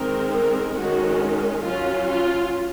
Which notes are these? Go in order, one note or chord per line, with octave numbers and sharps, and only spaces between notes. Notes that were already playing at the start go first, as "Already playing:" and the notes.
Already playing: D#3 G#3 C4 A#4
A#4
D#3 G#3 C#4 F#4
F#3 C#4 F4
F4